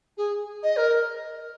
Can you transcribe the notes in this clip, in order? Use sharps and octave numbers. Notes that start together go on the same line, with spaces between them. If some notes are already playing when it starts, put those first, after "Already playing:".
G#4
D#5
A#4